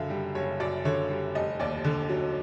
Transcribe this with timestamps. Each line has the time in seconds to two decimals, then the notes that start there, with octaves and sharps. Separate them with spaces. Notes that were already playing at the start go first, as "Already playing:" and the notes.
Already playing: F#1 F#2 D3 E5 F5
0.10 G3
0.35 F#1 C#5
0.60 F#2 D5
0.85 D3 C#5
1.10 G3
1.35 F1 D#5
1.59 D#2 D5
1.85 D3
2.09 F#3